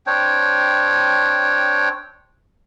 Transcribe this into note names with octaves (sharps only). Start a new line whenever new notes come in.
C4 D4 C#5 G5